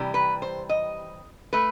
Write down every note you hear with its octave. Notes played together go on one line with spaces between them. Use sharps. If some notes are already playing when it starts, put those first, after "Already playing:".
Already playing: C3 E3 G3
B4
C5
D#5
A3 B4